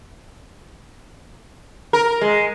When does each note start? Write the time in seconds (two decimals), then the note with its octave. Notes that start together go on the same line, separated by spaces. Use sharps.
1.93 A#4
2.21 G#3